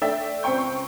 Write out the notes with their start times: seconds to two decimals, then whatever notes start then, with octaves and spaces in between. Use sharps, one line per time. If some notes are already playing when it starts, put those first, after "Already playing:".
0.02 A3 D4 E5 G5 E6 A6
0.43 C#2 C4 C5 G5 C#6 G6